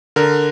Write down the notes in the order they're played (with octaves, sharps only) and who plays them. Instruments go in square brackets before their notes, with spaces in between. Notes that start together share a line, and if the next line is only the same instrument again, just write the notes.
[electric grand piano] D3 A#4